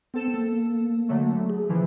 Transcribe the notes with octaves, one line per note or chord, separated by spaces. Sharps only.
B3 C4 A4 E7
A#3 A4
D3 F#3 A3
G#4
C#3 E3 F3